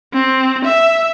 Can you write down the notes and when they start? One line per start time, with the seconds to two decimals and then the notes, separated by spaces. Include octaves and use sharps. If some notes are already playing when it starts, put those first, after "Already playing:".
0.13 C4
0.65 E5